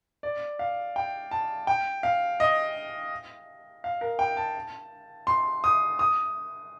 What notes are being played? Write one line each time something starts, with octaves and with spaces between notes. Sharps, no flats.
D5
F5
G5
A5
G5
F5
D#5
F5
A#4
G5
A5
C6
D#6
D#6